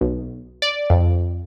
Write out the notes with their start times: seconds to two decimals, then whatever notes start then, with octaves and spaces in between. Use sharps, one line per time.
0.01 B1
0.62 D5
0.90 F2